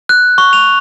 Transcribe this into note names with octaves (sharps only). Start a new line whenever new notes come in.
F#6
C#6
F7